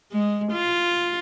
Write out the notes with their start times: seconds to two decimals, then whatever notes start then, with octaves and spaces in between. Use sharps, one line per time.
0.12 G#3
0.52 F4